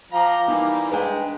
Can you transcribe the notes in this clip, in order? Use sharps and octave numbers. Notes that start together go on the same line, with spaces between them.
F3 F5 G5 A#5 D6
E3 G3 A#3 D#4
G#3 D4 B4 G5